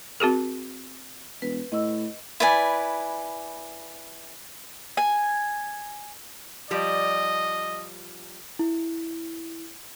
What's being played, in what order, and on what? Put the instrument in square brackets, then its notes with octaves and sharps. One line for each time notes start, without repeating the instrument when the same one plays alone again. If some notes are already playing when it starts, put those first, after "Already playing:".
[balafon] C4 F#4 G#4 A#4
[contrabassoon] E1 [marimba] B4
[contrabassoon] A2 [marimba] D#5 E6
[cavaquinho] E4 B4 D5 G#5
[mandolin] G#5
[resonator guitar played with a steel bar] F3 G3 D5 [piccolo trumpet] D#5
[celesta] E4